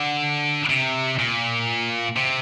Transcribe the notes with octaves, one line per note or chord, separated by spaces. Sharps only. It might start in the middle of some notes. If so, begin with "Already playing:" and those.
Already playing: D3
C3
A#2
C3